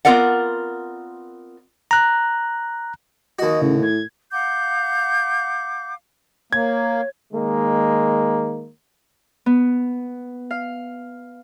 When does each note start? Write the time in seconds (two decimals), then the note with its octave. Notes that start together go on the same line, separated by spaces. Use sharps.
0.05 B3 C4 F4 A#4 D5 F#5
1.91 A#5 F#6
3.39 D#2 F#4 D#5
3.62 A2 C#3
3.83 G#6
4.32 F5 F#5 D6 G6
6.53 A#3 C#5 G#6
7.33 D#3 G#3 A#3
9.46 B3
10.51 F5